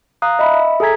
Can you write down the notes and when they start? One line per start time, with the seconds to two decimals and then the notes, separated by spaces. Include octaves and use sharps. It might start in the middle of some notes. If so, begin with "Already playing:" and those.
0.22 F5 A#5 D#6 F#6
0.39 D#5 E5 B5
0.53 E5
0.80 G#4 A4 G#5 A#5 G#6 B6